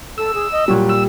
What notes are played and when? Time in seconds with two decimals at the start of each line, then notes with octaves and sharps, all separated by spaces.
0.18 A4 E6
0.34 G#4
0.52 D#5
0.68 A#2 F#3 G3
0.89 E6